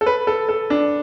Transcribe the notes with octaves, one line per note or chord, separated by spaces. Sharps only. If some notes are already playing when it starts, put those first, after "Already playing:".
A4
B4
A4
A4
D4